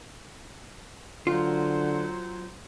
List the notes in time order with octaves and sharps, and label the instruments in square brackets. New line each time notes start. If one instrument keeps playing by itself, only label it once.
[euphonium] D3 [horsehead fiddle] F#3 C5 [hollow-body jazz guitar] F4